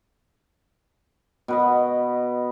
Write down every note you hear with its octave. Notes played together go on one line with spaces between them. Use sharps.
B2 B4 D#5